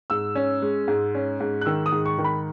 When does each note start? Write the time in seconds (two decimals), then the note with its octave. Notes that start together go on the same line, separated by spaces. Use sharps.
0.10 G#2 E6
0.35 C#4
0.62 G#3
0.88 G#2
1.15 C#4
1.40 G#2
1.61 F#6
1.66 D#3 E6
1.86 D#6
1.92 G#2
2.06 C#6
2.18 D#3
2.24 B5